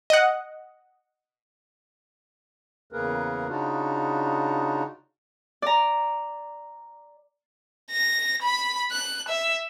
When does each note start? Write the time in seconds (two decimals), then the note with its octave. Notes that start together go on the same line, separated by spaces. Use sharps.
0.10 D#5 F#5
2.93 E2 C#3 A#3 G#4 A#4 B4
3.48 C#3 D4 D#4 F4 F#4
5.62 D5 A#5
7.91 A#6
8.42 B5
8.91 F#6
9.28 E5